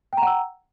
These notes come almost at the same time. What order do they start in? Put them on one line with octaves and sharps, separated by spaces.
G5 A#5 F#5 E6